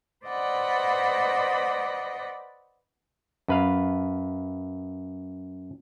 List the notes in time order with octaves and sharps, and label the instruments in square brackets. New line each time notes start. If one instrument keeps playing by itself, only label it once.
[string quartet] B4 C5 D5 D#5 F#5 B5
[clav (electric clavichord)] F#2 B4 F5